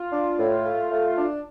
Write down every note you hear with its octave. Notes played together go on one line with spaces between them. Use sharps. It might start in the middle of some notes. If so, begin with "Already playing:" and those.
Already playing: F4
D4
A2
A3
A3
D4